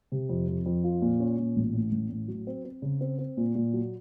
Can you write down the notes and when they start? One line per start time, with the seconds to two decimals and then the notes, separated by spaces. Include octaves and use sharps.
0.12 C3
0.29 F2
0.48 F2
0.66 F2
0.84 F4
1.02 A#2
1.20 C#4
1.38 A#2
1.56 A1
1.73 A2
1.92 A1
2.10 A2
2.28 F#3
2.47 C4
2.65 C4
2.82 C#3
3.01 C4
3.19 C4
3.37 A#2
3.55 A#2
3.74 F#3